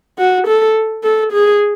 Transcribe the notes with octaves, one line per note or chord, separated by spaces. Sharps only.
F#4
A4
A4
G#4